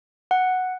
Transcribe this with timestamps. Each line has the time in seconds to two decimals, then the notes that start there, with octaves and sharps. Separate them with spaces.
0.31 F#5